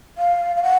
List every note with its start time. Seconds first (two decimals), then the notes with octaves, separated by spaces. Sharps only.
0.18 F5
0.56 F5
0.63 F#5